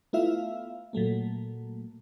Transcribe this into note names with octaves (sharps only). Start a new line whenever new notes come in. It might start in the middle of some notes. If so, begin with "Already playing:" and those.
A3 B3 E4 F4 E5 F5
A#2 F#3 A3 A#3